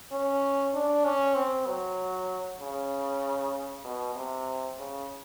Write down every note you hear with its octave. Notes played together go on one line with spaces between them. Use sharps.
C#4
D4
C#4
C4
F#3
C#3
B2
C3
C#3